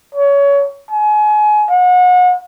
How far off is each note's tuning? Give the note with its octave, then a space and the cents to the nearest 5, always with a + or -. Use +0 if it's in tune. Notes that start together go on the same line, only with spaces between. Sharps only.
C#5 +25
G#5 +30
F#5 -35